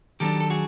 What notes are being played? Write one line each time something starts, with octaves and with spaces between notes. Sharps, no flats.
D#3 F#3 B3 D4 G4 A4
A4
F#4 G#4